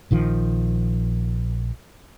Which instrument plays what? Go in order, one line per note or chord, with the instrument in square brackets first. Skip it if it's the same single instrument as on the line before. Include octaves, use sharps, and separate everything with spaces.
[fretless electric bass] A#1 D#3 F3